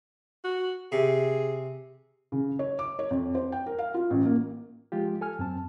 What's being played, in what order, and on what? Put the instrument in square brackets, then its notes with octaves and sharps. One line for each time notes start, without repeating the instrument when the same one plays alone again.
[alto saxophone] F#4
[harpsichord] C3 [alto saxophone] G#4
[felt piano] C#3
C#5
D6
C#5
F2
C5
G5
A#4
F5
F4
A1
A#3
[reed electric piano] F3 G#3 F4 G4
A4 G#5 F6
F#2 C4 A5